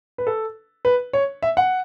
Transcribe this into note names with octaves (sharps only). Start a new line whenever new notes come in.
B4
A4
B4
C#5
E5
F#5